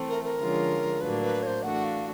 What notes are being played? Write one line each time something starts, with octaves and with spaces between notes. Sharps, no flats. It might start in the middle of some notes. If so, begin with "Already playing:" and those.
Already playing: E3 A3 C4
A#4
A#4
D3 F3 G#3 C#4 F4
A2 F#3 A#3 D4 B4
B4
C#5
C5
E3 A3 D4 F#4 F#5
F5